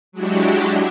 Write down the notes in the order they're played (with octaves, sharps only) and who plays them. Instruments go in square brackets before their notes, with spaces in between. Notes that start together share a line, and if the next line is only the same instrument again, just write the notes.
[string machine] F#3 G#3 D4 E4 F#4 G4